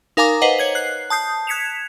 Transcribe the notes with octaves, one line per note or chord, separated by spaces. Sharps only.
D#4 A#4 F5 G#5 A#5 D6
B4 C5 D#5 F#5
C#5 G#6 F#7
F#6 C7
A5 D#6 G6 C7
F#6 G#6 B6 C#7 E7 F7